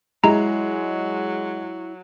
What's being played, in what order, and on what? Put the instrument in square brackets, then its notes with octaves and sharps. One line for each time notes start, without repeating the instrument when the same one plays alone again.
[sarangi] F#3 [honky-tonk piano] G#3 [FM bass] E4 [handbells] A#5